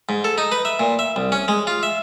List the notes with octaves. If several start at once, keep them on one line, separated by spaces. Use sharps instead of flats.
G#2
A4
D#4
B4
E5
A#2
E5
C2
C#4
G#3
F4
E5